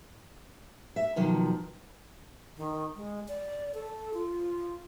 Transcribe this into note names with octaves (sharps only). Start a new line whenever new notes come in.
E5
B2 D#3 F3 F#3
D#3
G#3
D5
A4
F4